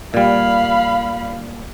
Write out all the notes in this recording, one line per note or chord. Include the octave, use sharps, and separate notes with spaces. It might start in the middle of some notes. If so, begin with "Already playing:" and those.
A#2 G3 F5 B5